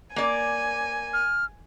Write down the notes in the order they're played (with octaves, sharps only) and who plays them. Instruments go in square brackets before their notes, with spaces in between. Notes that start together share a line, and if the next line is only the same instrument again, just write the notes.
[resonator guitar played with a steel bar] A#3 D5 [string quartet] G#5
[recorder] F6